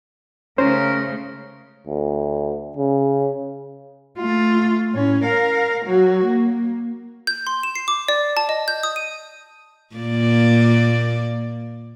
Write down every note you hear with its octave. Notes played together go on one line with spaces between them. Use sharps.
C#3 A3 C#4 A#4 C5
D2
C#3
A3 F4
A2 C#4
A#4 F5
F#3 F#4
A#3
G6
C6
E7
C7
D6
D5
A5
D#5
G6
D#6
D#7
A#2 A#3 D5